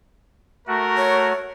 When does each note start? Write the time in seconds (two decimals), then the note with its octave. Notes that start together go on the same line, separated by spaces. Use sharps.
0.67 A3 F#4 A#4
0.97 C#5